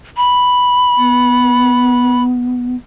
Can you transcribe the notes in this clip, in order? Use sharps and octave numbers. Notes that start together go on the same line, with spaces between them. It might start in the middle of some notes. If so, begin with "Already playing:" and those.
B5
B3